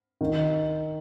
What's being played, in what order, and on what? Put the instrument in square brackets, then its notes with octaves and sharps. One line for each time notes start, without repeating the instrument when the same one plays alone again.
[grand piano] D#3